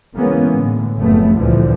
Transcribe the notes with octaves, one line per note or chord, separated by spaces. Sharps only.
C#3 E3 G#3 A#3 B3 C#4
A2 D3
F#1 F2 C#3 A3 B3
D2 G2 A#2 D3 E3 F3